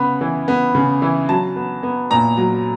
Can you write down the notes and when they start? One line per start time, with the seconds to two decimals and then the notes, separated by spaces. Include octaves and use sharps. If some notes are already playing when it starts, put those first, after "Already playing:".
Already playing: C#3 B3 B5
0.21 E3
0.48 B3
0.75 C#3
1.02 E3
1.29 F#3 A5
1.56 B3
1.83 B3
2.11 A#2 A#5
2.37 F#3